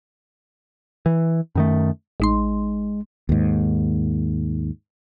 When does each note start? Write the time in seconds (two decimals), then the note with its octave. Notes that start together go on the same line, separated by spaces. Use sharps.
1.06 E3
1.55 F#2 D#3 A3
2.20 A1 G#3 D#4 C6
3.29 D#2 G#2